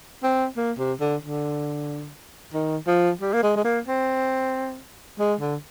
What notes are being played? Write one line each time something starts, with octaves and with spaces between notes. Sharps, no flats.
C4
A#3
C3
D3
D3
D#3
F3
G3
A#3
G#3
G#3
A#3
C4
G#3
D3